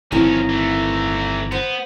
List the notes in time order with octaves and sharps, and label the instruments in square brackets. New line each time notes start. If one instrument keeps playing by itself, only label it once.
[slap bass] G1 D#3 C4 [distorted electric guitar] F3 C#4 [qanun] E4 B5 [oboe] A#5
[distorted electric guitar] E3 A3
[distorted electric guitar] B3 [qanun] C5